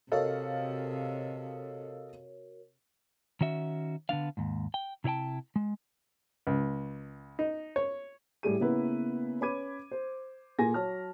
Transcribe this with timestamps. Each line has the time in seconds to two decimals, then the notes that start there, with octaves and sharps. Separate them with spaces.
0.12 C3 F#4 A4 A#4 C#5 D#5 F5
3.41 D#3 C#4 F#4 E5
4.09 D3 B3 D4 F5
4.37 D#2 G#2
4.74 G5
5.04 C3 E4 C#5 G5 A5
5.56 G#3
6.47 C#2
7.39 D#4
7.76 C#5
8.43 A2 G3 G#4 D#7
8.60 C#3 A#3 B3 E4 B4
9.41 C#4 B4 B5 D6 G#6 D#7
9.91 C5
10.59 A#2 G#4 A4 G#5 A#6
10.74 F#3 C#5 A5 F6